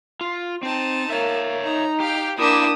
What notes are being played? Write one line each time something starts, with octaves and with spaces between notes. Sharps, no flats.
F4
C4 D#4 A5
A#3 C#5 E5
D#4 A#5
G4 F5 G5
A#3 D4 E4 G4 D#6 E7